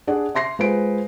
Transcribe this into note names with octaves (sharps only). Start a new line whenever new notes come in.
D4 G#4 D5 F#5
E5 C6 A#6 C7
G#3 F4 B4 C5 D7